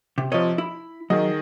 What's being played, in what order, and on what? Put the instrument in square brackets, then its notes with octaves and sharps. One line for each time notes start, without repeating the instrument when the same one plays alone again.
[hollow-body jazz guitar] C3
[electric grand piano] C3 F3 [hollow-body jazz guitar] C#5 D#5
[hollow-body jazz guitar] E4 [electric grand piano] B5
[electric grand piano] D#3 G#4 D#5 [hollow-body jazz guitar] F#3